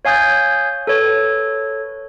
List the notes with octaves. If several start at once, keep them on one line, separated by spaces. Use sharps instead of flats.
C#5 F5 G#5 D#6 G6 A6
A4 B4 C#5